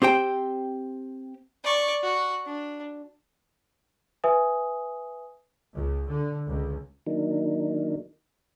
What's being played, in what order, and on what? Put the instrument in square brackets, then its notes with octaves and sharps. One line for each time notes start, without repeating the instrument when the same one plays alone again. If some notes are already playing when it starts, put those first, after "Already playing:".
[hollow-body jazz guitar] C4 G4 C5 G5
[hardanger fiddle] D5 C#6
F#4
D4
[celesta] B4 E5 G#5 D#6
[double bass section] C#2
D3
C#2
[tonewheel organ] D#3 F#3 A#3 D4 D#4